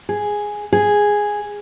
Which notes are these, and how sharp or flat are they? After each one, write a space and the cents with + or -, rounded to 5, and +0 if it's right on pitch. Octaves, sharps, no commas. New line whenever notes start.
G#4 +0
G#4 -5